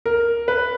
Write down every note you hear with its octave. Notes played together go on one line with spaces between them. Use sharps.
A#4
B4